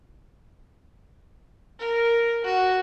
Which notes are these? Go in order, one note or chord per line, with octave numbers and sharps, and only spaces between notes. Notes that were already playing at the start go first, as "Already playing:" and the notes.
A#4
F#4